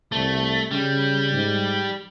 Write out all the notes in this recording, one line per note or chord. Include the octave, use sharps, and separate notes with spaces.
C2 A3
C#3 G3
G#2